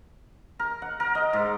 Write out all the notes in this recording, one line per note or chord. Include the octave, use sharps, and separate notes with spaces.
A#4
F#5
A#4
D#5
G#2